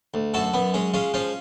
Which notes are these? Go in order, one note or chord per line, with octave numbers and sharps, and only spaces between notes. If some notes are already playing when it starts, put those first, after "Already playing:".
D2
F#2 F#4 A4
F#2 B3
G#3 C#4
G#3 C#4 F4
F3 C#4 F4